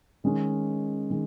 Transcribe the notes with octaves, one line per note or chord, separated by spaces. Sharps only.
D#3 G#3 C#4 G#4
D#3 G#3